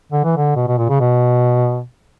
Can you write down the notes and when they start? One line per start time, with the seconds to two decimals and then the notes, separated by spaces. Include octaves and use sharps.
0.12 D3
0.24 E3
0.37 D3
0.57 B2
0.68 B2
0.78 A#2
0.89 C#3
1.00 B2